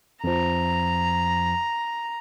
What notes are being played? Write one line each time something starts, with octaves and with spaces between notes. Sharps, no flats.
F2 F3 A#5